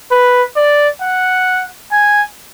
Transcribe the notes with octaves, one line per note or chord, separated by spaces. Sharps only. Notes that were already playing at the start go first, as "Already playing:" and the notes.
B4
D5
F#5
G#5